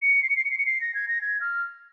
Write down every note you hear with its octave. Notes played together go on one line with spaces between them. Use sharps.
C#7
C7
C#7
C7
C#7
C7
C#7
C7
A#6
G#6
A#6
G#6
F6